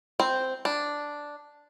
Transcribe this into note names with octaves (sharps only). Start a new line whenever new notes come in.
C4
D4